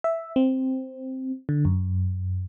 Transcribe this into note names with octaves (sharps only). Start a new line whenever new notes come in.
E5
C4
D3
F#2